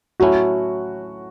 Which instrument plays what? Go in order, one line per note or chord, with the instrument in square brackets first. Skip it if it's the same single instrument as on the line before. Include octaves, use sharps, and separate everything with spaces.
[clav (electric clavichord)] A2 F#3 A3 C#4 E4 [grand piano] F#4